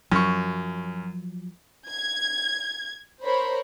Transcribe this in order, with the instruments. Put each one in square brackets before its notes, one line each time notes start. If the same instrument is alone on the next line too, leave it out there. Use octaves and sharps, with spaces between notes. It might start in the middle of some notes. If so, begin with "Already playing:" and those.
[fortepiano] F#2 C#6 [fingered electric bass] F3 F#3
[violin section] G#6
A#4 C5 C#5 B5